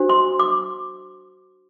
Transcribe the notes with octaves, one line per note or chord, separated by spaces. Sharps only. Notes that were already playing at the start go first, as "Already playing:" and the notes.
Already playing: D4 F#4 C5
C6
D6